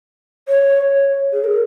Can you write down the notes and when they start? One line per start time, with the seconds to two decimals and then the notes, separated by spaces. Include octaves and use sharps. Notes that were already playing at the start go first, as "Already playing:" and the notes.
0.48 C#5
1.33 G#4
1.44 A#4